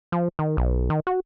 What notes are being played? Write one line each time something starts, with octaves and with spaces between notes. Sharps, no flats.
F3
D#3
B1
D#3
F#4